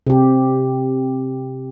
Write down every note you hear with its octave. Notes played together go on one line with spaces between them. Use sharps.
C3 G4